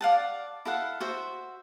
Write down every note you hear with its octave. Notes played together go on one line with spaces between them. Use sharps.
D5 F5 F#5 A5
E4 A4 F5 F#5
F#4 C5 E5